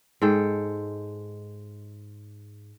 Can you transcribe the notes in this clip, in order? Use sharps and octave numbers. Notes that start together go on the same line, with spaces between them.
G#2 G#3 A4 G5